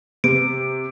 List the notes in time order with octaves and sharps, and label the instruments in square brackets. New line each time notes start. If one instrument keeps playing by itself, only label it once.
[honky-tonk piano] C3 [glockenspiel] D7